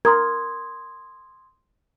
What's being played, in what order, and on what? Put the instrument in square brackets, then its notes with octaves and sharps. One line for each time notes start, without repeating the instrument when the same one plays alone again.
[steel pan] A#4 [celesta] C6 D#6 G#6